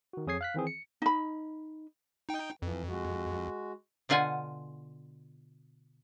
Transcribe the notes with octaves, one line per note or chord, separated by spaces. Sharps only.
D#3 F#4
F2 G#4 C#5 D#6 G#6 C7
F5 F#6 B6
D#3 E3 C4 G#4
C#7
D#4 B5
D#4 G5
F2 E3
G#3 F#4
B2 D3 F4 F#5 G#5